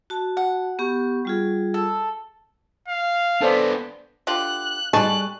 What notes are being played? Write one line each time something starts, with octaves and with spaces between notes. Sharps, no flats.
F#4 A5
F#5
B3 G4 C#6
G3 F4 G#4
A4
F5
B3 D4 A4 C5 D5
D3 F4 G4 F#6
G3 D#4 G#4 A5 C#6 F#6